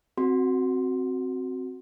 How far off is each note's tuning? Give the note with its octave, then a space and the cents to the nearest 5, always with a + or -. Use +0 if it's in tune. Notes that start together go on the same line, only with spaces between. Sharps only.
C4 +0 F#4 +0 C6 +0